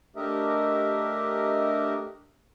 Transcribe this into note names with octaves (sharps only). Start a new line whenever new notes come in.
A3 D4 G4 A#4 D#5 E5